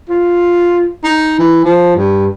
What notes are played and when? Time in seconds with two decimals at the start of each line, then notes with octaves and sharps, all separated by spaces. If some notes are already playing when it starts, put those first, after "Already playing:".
0.09 F4
1.04 D#4
1.39 E3
1.64 F3
1.96 G2